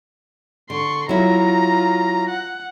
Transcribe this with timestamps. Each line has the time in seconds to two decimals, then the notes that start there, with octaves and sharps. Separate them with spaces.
0.70 D3 C6 C#6
1.09 F#3 E4 F4 A#5
2.29 F#5